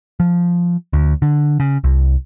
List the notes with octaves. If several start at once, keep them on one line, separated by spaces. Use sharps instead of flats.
F3
D2
D3
C#3
C2